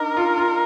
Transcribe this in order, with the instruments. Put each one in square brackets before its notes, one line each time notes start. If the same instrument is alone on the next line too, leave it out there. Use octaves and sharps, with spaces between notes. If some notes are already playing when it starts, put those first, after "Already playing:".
Already playing: [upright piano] D4 D#4 [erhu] A#4
[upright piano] F4
F4